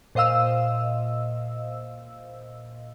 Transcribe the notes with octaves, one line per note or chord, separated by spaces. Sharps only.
A#2 C5 D#5 F5 E6